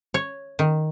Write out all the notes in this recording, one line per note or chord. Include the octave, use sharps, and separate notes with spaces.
C#5
D#3